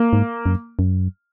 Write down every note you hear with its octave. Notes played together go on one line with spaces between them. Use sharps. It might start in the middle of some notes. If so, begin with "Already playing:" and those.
Already playing: A#3
G#2
F#2
F#2